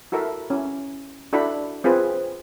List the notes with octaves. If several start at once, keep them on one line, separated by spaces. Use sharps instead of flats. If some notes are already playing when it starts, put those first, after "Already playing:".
E4 F#4 A4 A#4 E5
C#4 E4
D4 E4 F#4 A4 E5 B5
C4 F4 G#4 B4